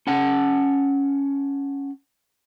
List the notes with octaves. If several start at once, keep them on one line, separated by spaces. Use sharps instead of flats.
C#4 F#5 A5